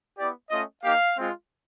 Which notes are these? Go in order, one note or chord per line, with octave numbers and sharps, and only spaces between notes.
B3 E4 G4 D5
A3 C#4 F4 D#5
A#3 D#4 G4 F5
G#3 C4 F4